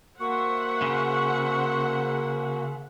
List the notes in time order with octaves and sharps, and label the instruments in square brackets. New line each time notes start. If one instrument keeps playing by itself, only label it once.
[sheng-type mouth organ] A#3 F#4 [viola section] C5 E5 F#5 [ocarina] C#6
[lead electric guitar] C#3